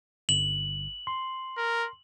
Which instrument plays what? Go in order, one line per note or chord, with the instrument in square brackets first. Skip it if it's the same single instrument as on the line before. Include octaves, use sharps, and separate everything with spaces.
[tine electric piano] G1 [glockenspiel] F#7
[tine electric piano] C6
[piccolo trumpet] A#4